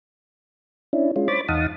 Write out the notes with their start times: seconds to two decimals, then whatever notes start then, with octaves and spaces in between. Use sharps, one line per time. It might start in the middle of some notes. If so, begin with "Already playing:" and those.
0.93 C#4 D4 E4
1.16 G#3 C#4 F4
1.28 C5 C#5 B5 D6 A6
1.48 E2 D#4 F5 F#5 A5 D#6